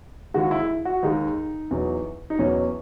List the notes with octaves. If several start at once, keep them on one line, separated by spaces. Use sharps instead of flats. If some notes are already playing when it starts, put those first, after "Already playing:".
D#2 D#3 G#3 F#4
E4
F#4
D#2 D#3 G#3 D#4
E2 B2 F#3
D#4
E2 B2 F#3 C#4